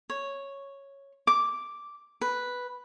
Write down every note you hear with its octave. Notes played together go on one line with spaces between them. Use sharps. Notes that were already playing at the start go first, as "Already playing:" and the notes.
C#5
D6
B4